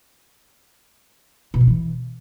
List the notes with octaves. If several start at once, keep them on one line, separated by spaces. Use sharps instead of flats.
B2
D#3
E3